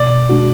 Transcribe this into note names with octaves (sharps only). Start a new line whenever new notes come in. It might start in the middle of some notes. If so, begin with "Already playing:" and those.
Already playing: B2 D5
G#3 D4 F#4